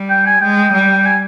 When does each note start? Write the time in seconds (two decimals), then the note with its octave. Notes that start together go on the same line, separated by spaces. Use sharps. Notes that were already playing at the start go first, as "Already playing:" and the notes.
Already playing: G3
0.10 G5
0.26 G#5
0.41 G#3 G5
0.73 G3
1.05 G#5